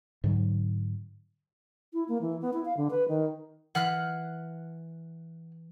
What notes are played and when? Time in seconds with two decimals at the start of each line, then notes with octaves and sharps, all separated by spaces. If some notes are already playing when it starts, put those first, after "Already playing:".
0.24 G#2 D3 F#3
1.93 E4
2.08 A#3
2.21 E3
2.41 B3
2.53 E4
2.65 F5
2.77 D3
2.91 B4
3.08 D#3
3.75 E3 F#5 F6 F#6 B6 C7